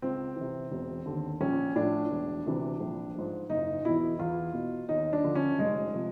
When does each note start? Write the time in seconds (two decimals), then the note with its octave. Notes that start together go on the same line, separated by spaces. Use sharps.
0.02 C#2 C4
0.36 C3 E3
0.71 E1
1.06 D#2 D3
1.41 A#1 C#4
1.76 A2 F3 D4
2.11 E1
2.46 D2 C3 E3
2.80 A#1
3.15 G#2 F3
3.50 F#1 D#4
3.85 E2 B2 E4
4.19 E2 F4
4.54 B2
4.89 D#2 D#4
5.13 D4
5.24 D3 F3
5.35 C#4
5.58 F1 G#3
5.94 C3 F3